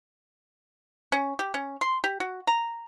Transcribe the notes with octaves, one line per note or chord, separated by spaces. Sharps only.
C#4
G4
C#4
C6
G4
F#4
A#5